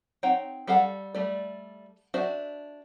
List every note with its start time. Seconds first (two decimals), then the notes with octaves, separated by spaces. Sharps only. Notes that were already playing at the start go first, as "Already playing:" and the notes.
0.23 C4 D#4 C#5 F#5 G5
0.67 G3 A4 F5 F#5 A5
1.15 G3 A3 D5
2.14 D4 F#4 C5 E5 A5